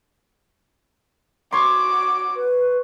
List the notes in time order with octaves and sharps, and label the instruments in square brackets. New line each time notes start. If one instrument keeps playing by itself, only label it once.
[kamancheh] F#4 D6 [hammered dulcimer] C#5 C6
[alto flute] B4